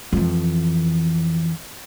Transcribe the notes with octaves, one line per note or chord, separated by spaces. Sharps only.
F2 E3